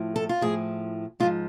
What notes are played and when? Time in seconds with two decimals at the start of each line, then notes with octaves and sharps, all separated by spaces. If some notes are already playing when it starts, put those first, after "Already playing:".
Already playing: A2 F3
0.16 A4
0.29 F4
0.41 A2 F3 G#4
1.20 G#2 F3 F4